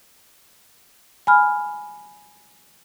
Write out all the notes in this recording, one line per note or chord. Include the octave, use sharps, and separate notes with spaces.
G#5 B5 F6